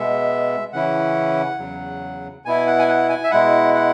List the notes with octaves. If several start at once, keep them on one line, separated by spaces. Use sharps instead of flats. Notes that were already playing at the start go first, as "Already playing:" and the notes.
Already playing: B2 G#3 B3 E5
C#3 E3 C#4 E4 F#5
E2 C#3 F#3
B2 B3 E4 G#5
F#5
G#5
F#5
G#5
E5
B2 G#3 E4 F#5
F#5